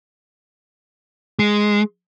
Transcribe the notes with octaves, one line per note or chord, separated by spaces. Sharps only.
G#3